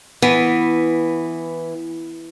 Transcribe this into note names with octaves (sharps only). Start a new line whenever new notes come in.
E3 B3